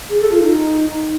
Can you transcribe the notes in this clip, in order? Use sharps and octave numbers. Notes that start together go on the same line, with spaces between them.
G#4
A4
F4
D#4